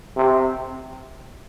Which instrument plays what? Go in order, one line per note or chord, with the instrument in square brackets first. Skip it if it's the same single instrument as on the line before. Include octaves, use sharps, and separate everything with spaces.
[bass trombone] C3